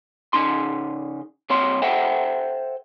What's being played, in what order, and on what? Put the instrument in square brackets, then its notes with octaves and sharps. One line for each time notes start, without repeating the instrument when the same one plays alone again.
[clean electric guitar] C#3 C#4 D#4 C6
C2 C4 C#5 F5 C6
A4 C5 E5 F#5 G5